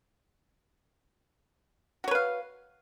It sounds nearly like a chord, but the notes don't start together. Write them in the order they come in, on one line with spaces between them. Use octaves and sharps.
F#4 C#5 B4 F5